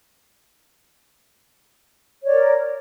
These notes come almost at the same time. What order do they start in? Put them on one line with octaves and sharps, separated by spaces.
C#5 D5 A#4